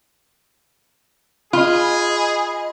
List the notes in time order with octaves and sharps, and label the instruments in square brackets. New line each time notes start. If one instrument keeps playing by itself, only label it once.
[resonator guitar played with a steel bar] F4 [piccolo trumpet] G#4 [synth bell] D#5 B5